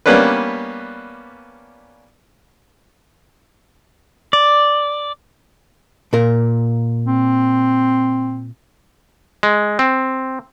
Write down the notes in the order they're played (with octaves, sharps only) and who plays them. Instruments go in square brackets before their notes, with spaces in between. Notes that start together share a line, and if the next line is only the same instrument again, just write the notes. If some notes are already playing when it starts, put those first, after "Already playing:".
[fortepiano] G3 A#3 B3 C#4 D4 B4
[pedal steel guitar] D5
[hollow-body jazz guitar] A#2 A#4
[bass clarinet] C4
[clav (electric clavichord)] G#3
C4